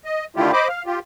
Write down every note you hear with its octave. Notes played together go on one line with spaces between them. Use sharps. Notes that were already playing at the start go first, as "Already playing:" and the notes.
D#5
D3 D#3 A3 E4 F4 G4
C5 D#5 B5 D6
F5
F4 G4